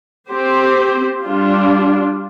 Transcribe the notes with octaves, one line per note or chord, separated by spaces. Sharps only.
C4 G4 C5
G3 D4 F4